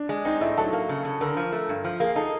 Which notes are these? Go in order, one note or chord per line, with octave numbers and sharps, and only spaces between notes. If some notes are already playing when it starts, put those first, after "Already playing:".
Already playing: D4
G#3
C4 D#4
A2 E4
F#3 A4
A#3
C#3
C#3
D3 A#4
F3
A3
G2
F3
A#3 G#4
D#4 A4